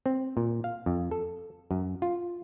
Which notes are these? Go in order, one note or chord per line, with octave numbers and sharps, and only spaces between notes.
C4
A#2
F5
F2
A4
F#2
F4